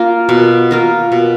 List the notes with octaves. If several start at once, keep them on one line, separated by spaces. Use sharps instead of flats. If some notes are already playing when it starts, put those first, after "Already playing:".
Already playing: A#3 F4 A#4
B2
A#3 F4 A#4
B2